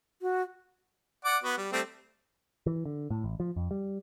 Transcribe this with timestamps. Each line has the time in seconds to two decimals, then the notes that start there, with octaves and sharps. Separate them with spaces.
0.22 F#4
1.25 D5 F#5 D6
1.43 B3 F#4
1.57 G3
1.73 G3 A3 C4
2.66 E3
2.85 D3
3.10 A2
3.24 A1
3.40 F3
3.56 F2
3.71 G3